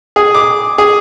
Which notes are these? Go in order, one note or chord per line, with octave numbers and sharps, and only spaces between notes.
G#4
D6
G#4